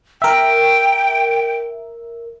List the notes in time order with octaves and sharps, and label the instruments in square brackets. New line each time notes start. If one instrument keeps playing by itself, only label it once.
[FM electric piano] A#4 E5 [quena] G5